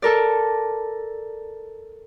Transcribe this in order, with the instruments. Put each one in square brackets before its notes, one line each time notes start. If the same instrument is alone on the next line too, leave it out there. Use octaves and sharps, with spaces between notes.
[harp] A4 A#4 D5